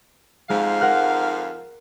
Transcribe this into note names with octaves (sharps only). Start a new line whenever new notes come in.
F2 G#2 G#3 F5
A#4 F#5 F6